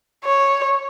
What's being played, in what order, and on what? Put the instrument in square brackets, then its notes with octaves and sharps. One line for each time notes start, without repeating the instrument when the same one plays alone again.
[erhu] C#5